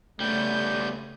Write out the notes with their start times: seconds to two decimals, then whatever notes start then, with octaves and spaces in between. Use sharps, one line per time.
0.20 C#3 G3 A3 B3 G6